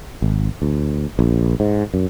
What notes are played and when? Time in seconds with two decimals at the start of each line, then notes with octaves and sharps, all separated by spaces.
0.22 G#1
0.62 D2
1.19 A#1
1.60 G#2
1.94 F#2